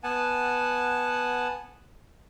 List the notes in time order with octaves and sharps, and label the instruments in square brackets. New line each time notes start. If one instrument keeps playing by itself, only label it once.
[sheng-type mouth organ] B3 F#5 G#5 A5